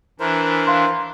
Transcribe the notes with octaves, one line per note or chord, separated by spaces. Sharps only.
E3 D4 E4 A#4 C5
F5 C6